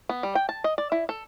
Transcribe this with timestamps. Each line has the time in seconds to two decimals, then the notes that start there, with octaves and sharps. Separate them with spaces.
0.09 B3
0.23 G3
0.35 G5
0.49 A5
0.64 D#5
0.78 D5
0.92 E4
1.09 A4